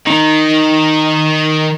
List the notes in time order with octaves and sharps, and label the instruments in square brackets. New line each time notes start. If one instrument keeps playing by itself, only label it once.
[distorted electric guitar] D#3 [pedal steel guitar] D#4